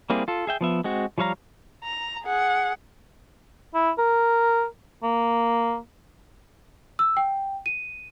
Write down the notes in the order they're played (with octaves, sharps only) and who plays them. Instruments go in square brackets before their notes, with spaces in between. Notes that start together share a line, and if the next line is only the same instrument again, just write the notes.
[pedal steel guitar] G3 A#3 C4 E4 G#4
F4 A4
G#4 E5 G5
F3 B3 E5
G#3 C4 F#4
F3 G3 C#5 F5 A#5
[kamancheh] A#5
G#4 F#5
[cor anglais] E4
A#4
A#3
[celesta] E6
G5
D#7